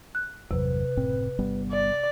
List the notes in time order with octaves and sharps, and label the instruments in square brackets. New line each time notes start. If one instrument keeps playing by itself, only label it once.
[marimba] F#6
[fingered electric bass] G1 E2 F#3 [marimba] C3 [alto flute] B4
[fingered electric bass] F#1 A2 C4
G1 G3 B3
[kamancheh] D5